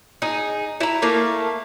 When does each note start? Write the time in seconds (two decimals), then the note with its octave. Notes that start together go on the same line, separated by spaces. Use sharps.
0.22 D#4 G#4
0.80 E4 A#5
1.02 A3 A#3 F5